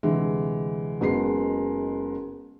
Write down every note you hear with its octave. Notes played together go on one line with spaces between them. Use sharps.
D2 C3 E3 G#3
F#1 F#3 G#3 B3 C7